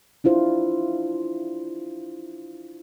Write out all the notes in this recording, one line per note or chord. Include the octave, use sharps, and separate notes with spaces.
D4 E4 F4 C5